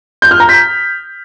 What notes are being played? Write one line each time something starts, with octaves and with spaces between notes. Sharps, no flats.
G6
F6
A#5
B6